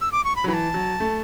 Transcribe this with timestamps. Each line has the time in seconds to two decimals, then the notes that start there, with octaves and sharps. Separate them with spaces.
0.01 E6
0.12 D6
0.24 C#6
0.36 B5
0.44 F#3
0.48 E3 B5
0.53 A5
0.74 F#3
1.00 A3